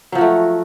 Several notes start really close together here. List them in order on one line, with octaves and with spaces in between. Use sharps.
F#3 F3 F#4 A3